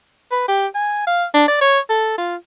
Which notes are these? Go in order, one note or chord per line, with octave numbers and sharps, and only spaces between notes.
B4
G4
G#5
F5
D4
D5
C#5
A4
F4